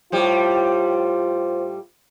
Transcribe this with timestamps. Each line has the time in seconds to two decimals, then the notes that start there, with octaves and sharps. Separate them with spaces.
0.12 A2 G3 F4 C5 D6